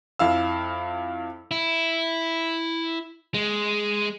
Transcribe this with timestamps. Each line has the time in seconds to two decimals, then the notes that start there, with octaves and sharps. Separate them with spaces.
0.19 F2 E4 F5 E6
1.51 E4
3.34 G#3